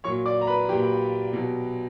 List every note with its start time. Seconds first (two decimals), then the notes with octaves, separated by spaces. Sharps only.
0.04 A#2 F#3 C#5 C#6
0.26 D5 D6
0.41 A#5
0.47 B4 B5
0.69 A#2 F#3 G4 G5
1.33 B2 F#3